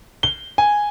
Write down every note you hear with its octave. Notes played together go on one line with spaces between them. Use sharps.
G7
G#5